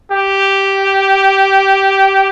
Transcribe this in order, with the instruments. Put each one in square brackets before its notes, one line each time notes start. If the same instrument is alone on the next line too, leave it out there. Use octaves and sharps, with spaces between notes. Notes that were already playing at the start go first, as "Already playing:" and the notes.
[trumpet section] G4